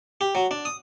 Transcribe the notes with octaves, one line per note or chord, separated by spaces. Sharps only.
G4
F#3
D4
D#6